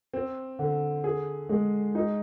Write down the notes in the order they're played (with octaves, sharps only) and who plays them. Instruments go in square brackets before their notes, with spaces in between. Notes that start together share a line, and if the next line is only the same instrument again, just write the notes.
[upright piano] C4
D3
G#4
G#3
D#4